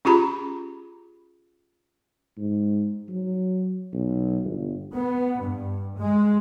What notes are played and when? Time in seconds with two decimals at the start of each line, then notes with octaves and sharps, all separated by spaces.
0.05 C#4 F4 G4 G#4 A#5 B5
2.38 G#2
3.09 F#3
3.93 B1
4.44 G1
4.93 B3
5.42 G2
5.97 G#3